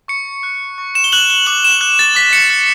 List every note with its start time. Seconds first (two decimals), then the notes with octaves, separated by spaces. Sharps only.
0.08 C#6 C#7
0.43 F#6
0.78 C#6
0.95 E7
1.04 G7
1.12 F#6 F#7
1.30 G7
1.46 D6 F#7
1.64 E7
1.81 F#6
1.99 A6
2.15 D6 B6
2.33 C#7
2.50 F#6